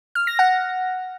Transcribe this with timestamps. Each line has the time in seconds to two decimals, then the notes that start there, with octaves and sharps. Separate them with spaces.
0.15 F6
0.27 A#6
0.39 F#5